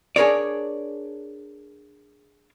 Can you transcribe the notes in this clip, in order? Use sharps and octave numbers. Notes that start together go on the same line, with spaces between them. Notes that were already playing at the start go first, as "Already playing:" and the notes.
D4 G#4 A#4 C#5 D5